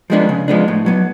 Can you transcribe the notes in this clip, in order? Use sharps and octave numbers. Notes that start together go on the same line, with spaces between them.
F3 G#3 B3 D4
C#3
F3 G#3 B3 D4
A2
F#3 B3